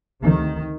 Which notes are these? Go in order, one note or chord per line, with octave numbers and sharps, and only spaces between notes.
D2 C3 D#3